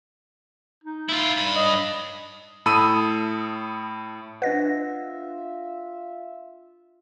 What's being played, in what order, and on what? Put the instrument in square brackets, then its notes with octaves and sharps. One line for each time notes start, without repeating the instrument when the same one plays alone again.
[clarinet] D#4
[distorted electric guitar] E4 F4
G2 B5
[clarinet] D#5
[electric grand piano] A2 A4 B5 D#6 E6 D#7
[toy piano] D4 D#5 F#5 [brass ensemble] F4 E5 [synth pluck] B4 A#6